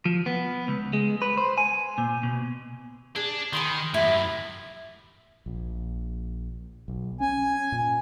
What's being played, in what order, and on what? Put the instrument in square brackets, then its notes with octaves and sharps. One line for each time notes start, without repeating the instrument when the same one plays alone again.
[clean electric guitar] F3
B3
C#2
G#3
B4
C5
G#5
A#2
B2
[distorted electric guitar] D4 [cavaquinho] G#4
[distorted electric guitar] D#3 [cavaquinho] G#5 B5 C6
[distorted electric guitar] F#2 A2 [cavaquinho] E4 G4
[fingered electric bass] A#1
B1
[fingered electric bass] C#4 [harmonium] G#5
[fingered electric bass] A#2